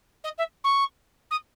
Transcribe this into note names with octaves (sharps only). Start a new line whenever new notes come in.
D#5
E5
C#6
D#6